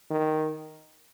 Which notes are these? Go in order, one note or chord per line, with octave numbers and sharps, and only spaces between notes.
D#3